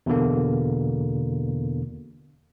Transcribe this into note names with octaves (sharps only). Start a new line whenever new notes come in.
E2 B2 D3 A#3